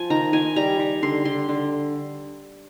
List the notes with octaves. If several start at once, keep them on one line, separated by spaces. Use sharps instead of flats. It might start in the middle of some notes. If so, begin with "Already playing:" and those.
Already playing: F3 G#5
D#3 A#5
D#3 G#5
G3 A#5
G3
D3 C6
D3 C6
D3